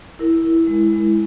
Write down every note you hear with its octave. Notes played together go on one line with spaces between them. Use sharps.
E4 A#4
E4
G#3
G#3